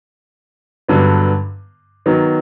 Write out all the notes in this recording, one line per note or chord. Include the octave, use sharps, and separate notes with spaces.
G2 D3 F#3 B3
D#3 F#3 B3